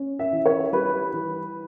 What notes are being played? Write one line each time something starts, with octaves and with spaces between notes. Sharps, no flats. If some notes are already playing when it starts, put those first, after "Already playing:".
Already playing: C#4
E5
E3
C#5
G3 B4
E3